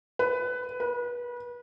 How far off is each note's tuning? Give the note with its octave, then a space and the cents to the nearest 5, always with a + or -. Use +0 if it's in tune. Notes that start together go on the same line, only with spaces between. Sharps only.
B4 +15
B4 -30